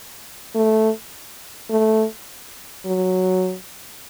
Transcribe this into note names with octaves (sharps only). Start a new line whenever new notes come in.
A3
A3
F#3